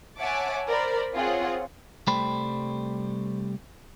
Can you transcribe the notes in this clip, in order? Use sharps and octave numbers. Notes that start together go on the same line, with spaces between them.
C#5 E5 F#5 G#5 A5 D6
A#4 C5 D5 B5
C4 F4 G#4 C#5 F#5
C2 G3 A3 C5 G5 B5